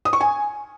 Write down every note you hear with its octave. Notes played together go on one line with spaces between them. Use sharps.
D#6
C#6
G#5